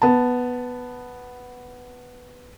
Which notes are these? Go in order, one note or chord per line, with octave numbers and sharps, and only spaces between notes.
B3 A5